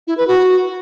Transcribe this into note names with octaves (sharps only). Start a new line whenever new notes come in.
E4
B4
F#4